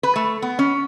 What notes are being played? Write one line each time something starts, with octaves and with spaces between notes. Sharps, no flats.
B4
A3
B3
C#4